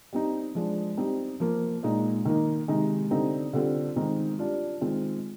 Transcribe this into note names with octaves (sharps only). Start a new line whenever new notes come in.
G3 C4 D#4
F3 G#3 D4
G3 C4 D#4
F3 A#3 F4
A#2 G#3 D#4
D#3 A#3 D#4
C3 D#3 G#3 D#4
D3 G3 C4 D#4
D3 G3 C4 F4
D#3 G#3 C4 D#4
G3 D4 F4
D#3 G#3 C4 F4